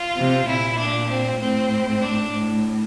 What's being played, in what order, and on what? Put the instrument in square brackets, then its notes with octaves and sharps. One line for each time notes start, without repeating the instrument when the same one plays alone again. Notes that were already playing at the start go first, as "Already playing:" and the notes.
Already playing: [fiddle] F4
[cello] C3
[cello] A#2 [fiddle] E4
[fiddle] D4
C4
[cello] A2 [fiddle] C4
[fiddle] D4
[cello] A2